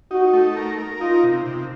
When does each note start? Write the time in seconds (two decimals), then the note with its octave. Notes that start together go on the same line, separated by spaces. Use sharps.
0.11 D#4 F#4
0.33 A3
0.57 A#4
0.78 A#4
1.01 D#4 F4
1.23 C3
1.46 C3